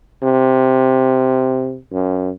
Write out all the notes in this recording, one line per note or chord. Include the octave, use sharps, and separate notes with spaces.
C3
F#2